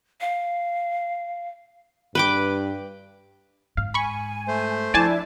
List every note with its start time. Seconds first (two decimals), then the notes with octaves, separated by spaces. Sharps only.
0.21 F5
2.15 G2 B4 G5 D6
3.77 G#2 F5
3.94 G#5 B5 C#6
4.48 A3 C5
4.94 F3 D4 E4 D5 G#5 A5